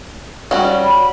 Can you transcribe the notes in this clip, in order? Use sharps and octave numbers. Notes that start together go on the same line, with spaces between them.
G3 C#4 F#4
B5